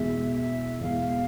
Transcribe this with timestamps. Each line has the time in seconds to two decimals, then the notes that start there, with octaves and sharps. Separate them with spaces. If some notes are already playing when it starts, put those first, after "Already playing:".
Already playing: E2 B2 G#3 E5
0.36 E5
0.81 E2 B2 G#3 F5